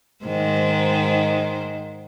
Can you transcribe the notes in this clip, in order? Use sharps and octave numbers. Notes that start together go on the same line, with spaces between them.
G#2 D#3 C5